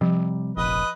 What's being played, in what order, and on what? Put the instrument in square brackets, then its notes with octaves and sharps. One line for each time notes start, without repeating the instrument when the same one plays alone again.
[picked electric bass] C3 G3 [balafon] F3
[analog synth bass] F1 [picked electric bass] A#1 [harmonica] B4 D#5